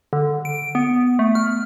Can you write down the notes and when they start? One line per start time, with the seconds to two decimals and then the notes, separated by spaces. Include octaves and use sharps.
0.13 D3
0.45 D7
0.75 B3
1.19 A3
1.35 F6